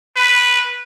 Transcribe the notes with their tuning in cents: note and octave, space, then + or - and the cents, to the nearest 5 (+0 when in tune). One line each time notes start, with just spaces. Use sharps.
B4 -5